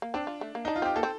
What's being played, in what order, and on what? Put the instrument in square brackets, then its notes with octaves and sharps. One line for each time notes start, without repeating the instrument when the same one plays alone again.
[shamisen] A#3
[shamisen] C4 [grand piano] D4
[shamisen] F4
A3
A#3
[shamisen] D4 [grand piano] D#4
[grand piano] F4
[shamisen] C4 [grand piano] G4
[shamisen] A#3 [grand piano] A4
[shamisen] C4